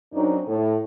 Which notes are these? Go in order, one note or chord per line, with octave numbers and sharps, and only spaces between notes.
F#2 F#3 C4 D4 D#4
A2